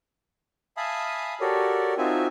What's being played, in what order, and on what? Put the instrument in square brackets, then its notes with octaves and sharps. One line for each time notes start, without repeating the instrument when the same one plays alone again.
[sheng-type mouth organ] E5 F5 G#5 A5 B5 D#6
F#4 G4 A4 A#4 C#5 D5
C4 D#4 F4 F#4 E5 G#5